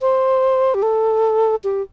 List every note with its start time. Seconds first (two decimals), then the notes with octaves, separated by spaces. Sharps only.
0.01 C5
0.74 G4
0.83 A4
1.64 G4